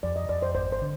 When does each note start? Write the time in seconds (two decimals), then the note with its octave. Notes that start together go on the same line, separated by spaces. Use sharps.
0.03 F2 D5
0.16 D#5
0.29 F2 D5
0.42 C5
0.54 G#1 C5
0.72 C5
0.81 D3